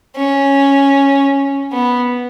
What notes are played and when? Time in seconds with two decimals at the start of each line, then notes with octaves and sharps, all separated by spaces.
0.16 C#4
1.73 B3